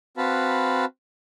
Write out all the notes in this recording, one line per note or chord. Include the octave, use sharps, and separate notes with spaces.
C4 F#4 B4 F5 A5 B5